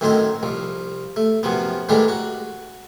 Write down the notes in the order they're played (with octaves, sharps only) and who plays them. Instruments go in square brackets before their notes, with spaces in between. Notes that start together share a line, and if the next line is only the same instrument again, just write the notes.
[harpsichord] F#2 A2 D#3 C4 D#4 C5
C2 F3
A3
F#2 C3 F3 B3
A2 D#3 E3 G3 G#3 D4
F#4